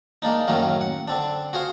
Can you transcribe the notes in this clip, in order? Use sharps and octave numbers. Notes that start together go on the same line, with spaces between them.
G#3 A#3 D4 D#4
F#2 A2 D#3 F#3 A#3 C#4
F#5
D3 C4 D4
F#4 G#4 C5 F5 C6